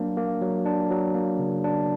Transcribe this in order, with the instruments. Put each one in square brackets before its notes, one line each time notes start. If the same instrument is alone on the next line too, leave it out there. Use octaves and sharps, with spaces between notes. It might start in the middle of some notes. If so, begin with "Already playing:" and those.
Already playing: [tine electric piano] F#3 A#3 D4
A#3
F#3
D4
F#3
A#3
C#3
D4